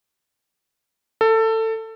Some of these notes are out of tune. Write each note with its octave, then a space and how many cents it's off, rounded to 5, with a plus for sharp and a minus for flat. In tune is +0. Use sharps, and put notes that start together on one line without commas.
A4 +20